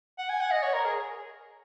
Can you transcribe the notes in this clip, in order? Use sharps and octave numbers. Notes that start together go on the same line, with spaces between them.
F#5
G#5
F#5
D#5
C#5
A#4
G#4